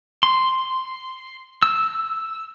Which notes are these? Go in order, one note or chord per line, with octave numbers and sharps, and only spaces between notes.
C6
E6